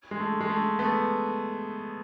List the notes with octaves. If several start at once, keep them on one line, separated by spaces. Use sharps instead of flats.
G#3
A3
G#3
A3
A3 B3